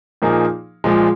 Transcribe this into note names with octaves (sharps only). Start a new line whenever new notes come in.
A#2 F3 A#3 D#4 G#4
A#2 F3 G#3